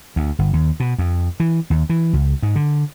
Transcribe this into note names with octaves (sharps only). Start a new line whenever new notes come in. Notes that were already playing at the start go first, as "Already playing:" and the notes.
D2
G1
D#2
B2
F2
E3
D#2
E3
C#2
G#2
D3